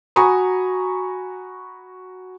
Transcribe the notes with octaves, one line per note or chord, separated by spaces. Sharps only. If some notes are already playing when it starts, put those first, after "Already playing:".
F#4 G#5 A#5 B5 C#6 D#6